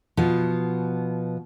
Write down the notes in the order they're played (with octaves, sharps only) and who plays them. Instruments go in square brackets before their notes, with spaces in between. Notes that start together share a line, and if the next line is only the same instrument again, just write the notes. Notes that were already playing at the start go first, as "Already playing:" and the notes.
[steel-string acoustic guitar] B2 F3 B3